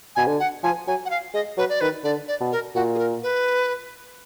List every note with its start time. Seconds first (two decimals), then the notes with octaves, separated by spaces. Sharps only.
0.16 B2 G#5
0.27 D3
0.40 F#5
0.63 F3 G#5
0.87 F#3 G#5
1.05 F#5
1.10 F5
1.34 G#3 D#5
1.57 F#3 B4
1.69 D5
1.81 D#3 B4
2.04 D3 D5
2.28 D5
2.41 B2
2.52 A#4
2.75 A#2 F#4
2.95 G#4
2.99 A#4
3.23 B4